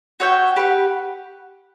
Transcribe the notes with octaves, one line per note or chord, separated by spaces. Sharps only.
F#4 C#5 E5 G5
G4 B4 F#5